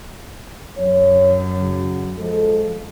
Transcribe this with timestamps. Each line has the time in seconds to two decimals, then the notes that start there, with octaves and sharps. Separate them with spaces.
0.77 F#2 C#5
1.56 C#3 F#3
2.18 F3 G#3 A4